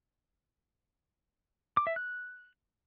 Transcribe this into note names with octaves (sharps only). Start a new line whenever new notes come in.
D6
E5
F#6